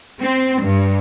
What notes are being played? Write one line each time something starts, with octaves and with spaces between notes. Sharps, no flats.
C4
G2